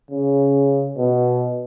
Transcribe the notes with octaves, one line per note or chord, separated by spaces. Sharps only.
C#3
B2